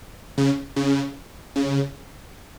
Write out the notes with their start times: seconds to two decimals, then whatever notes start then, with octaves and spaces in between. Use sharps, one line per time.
0.38 C#3
0.76 C#3
1.56 C#3